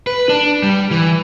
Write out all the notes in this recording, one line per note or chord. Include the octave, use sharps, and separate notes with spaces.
B4
D4
G3
E3